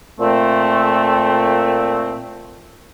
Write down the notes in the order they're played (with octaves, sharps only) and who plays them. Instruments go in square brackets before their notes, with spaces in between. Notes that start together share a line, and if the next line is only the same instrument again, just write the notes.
[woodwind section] A#2 A3 C4